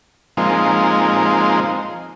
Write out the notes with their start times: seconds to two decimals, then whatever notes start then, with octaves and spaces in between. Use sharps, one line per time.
0.37 F3 G#3 A#3 C4 D#4